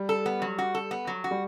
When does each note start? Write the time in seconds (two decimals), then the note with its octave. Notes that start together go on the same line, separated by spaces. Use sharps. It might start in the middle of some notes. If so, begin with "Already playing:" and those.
Already playing: G3
0.09 A4
0.26 B3
0.42 F#3
0.58 F#4
0.75 A4
0.91 B3
1.07 F#3
1.24 F#4
1.31 G3